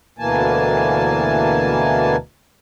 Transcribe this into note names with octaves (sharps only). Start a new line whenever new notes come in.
D2 B2 E3 A#3 G#5 A5